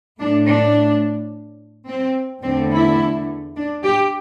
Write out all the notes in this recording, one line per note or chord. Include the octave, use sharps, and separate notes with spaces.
A2 A3 D4
D4
C4
E2 D3 A3 C4
E4
D4
G4